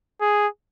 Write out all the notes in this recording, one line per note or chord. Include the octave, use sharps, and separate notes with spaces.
G#4